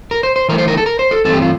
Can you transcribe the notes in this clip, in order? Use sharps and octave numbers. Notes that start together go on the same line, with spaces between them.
A#4
C5
C5
E3 A3 E4 A#4
C5
A#4
A4
A#4
C5
A4
G2 E3 A3 C4 A4
G4
F4